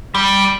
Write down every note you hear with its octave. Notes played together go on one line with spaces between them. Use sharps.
G3